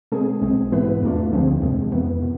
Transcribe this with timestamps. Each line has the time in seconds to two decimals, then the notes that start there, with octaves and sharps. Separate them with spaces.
0.12 B2 G#3 C4 G#4
0.41 B1 B2 G#3 C4
0.72 G#2 E3 B3 E4 B4
1.02 E2 B2 A3 D4 F4
1.32 D2 D3 F3 G#3 C4
1.62 E2 C3 G#3
1.92 F2 E3 B3
2.22 B2